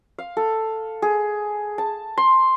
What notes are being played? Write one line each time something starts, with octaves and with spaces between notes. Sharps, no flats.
F5
A4
G#4
A5
C6